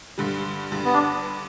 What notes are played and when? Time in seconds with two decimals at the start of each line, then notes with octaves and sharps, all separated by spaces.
0.18 G2 D3 G3
0.72 G2 D3 G3
0.85 B3
0.93 D4